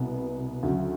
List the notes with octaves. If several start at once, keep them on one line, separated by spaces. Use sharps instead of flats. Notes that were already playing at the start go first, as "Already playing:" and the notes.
Already playing: C2 B2 B3
D2 C#3 F#3